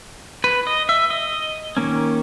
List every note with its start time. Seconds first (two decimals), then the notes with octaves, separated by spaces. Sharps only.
0.44 B4
0.67 D#5
0.89 E5
1.10 D#5
1.77 D#3 A#3 C#4